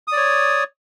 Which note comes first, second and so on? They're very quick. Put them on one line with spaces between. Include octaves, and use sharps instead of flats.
D#6 D5 C#5